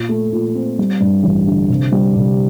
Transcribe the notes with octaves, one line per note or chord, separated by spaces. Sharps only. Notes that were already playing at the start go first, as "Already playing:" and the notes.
Already playing: A#2
A3
A#2
C4
G3
G2
A1
D3
C3
G3
C3